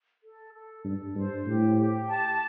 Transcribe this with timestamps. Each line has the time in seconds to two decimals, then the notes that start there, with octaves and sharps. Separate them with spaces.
0.22 A4
0.53 A4
0.84 G2 A4
1.15 G2 C5
1.46 A2 G4
1.77 G4
2.08 A5